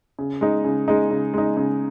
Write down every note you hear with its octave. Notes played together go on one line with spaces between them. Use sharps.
C#3
G#3 D#4
C#3
G#3 D#4
C#3
G#3 D#4
C#3